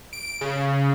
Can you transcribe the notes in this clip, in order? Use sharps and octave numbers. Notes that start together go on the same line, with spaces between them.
D7
C#3